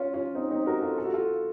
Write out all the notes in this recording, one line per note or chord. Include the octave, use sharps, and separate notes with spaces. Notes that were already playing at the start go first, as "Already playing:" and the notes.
Already playing: C#4 F4
C#4 F4
C4 D#4
C4 D#4
F#4 A#4
F4 A4
A4
F#4
F4 A4